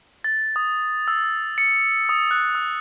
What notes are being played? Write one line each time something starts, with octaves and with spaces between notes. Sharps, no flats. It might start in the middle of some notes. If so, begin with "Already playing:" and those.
A6
D#6
E6
C#7
D#6
F#6
E6